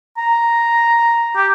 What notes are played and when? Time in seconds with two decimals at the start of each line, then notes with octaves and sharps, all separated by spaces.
0.18 A#5
1.36 G4